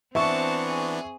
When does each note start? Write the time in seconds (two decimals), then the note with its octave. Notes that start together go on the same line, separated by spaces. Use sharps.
0.15 E3 B3 C4 D4 E5 A5 C#6 C#7
0.67 G#4